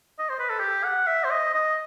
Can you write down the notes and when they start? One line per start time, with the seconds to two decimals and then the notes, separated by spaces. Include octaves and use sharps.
0.19 D#5
0.29 C5
0.39 B4
0.50 A4
0.59 G4
0.84 F#5
1.07 E5
1.24 C5
1.31 D#5
1.54 D#5